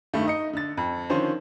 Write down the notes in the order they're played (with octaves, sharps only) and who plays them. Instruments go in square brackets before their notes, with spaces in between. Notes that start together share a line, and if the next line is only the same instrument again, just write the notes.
[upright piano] G2 D#3 A3
D#4 D#5 C#7
D3 A6
F2
D3 D#3 F3 C#4 C5